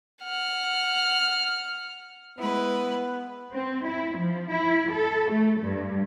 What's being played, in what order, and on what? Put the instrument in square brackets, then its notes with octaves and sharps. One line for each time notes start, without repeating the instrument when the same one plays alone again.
[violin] F#5 F6
[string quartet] G#3 E4 B4 [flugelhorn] B3
[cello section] C4
E4
F3
E4
A4
A3
G2